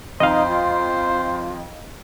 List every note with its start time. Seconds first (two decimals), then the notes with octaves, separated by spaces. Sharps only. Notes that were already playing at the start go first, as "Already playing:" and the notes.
0.20 F2 D#4 C5 D#5 F5
0.48 F4